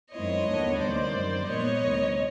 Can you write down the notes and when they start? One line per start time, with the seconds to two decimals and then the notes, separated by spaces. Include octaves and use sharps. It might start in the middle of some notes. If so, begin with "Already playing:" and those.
0.12 F#2 D#3 G#3 C4 E4 C#5 D#5
0.47 D#2 D3 G3 B3 D4
0.80 D2 C3 D#3 G3 A#3 C5 D5
1.15 F#2 D#3 G3
1.48 A#2 F3 G#3 B3 C#5 D#5
1.83 D2 C3 D#3 G3